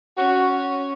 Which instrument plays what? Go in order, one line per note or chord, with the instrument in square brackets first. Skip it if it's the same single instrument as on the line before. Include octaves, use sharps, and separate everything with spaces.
[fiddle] C#4 [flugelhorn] F#4